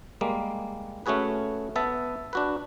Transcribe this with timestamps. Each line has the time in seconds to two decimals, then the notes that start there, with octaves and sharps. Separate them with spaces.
0.21 G3 G#3 A#3
1.06 A3 C#4 F#4 G#4 B4
1.76 B3 E5 A5
2.33 D4 F#4 B4